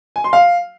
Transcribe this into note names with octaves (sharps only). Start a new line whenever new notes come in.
G#5
C6
F5